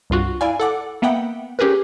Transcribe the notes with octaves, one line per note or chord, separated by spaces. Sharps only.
C2 G2 F4 F#4
E4 D5 F5 G#5
A4 F#5 D6
A#3 B3 E5 F#5 G5
C#4 G4 G#4 A#4 B4